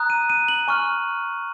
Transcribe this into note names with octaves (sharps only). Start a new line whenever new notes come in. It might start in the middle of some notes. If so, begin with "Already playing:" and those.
Already playing: A#5 D#6 F#6
D#7
D#7
F#7
G#5 C#6 F6